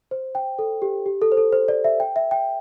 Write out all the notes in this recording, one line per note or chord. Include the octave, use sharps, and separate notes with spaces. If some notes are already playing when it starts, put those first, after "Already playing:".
C5
G5
A4
G4
G4
A4
C5
A4
C5
D5
E5
G5
E5
G5